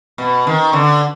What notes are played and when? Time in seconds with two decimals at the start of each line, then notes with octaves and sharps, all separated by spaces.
0.18 B2
0.47 D#3
0.73 D3